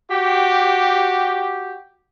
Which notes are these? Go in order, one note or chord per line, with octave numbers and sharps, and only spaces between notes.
F#4 G4